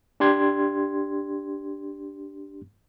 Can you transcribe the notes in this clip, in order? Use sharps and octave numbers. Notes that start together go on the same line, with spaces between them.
D4 G4 C6 G#6